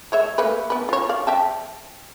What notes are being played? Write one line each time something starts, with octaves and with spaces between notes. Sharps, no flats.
G#3 C#5 E5
A3 A#3 B4
B3 B4
F4 C#5
D5 F5
E5 G5 A5